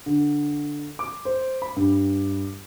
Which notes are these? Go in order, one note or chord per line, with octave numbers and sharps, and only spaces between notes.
D3
D6
C5
B5
G2